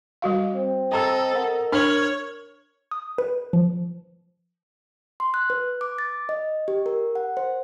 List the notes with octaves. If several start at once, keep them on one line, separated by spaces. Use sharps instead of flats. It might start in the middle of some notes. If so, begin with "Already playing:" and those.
G3 F#4 F5
C4
A4 D#5 A#5 E6
A#4 F#5
D4 C#5 F6 F#7
D#6
B4
F3
C6
F#6
B4
D6
A6
D#5
G4
A#4
F#5
C5